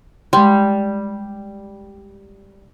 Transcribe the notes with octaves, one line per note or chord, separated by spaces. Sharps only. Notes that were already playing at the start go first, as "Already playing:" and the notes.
G3 G#3 C6